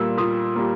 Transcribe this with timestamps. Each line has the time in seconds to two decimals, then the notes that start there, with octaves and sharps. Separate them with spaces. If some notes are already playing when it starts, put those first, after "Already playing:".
Already playing: A#2 G3 A#3 E6
0.18 A#2 D#6
0.56 G3 A#3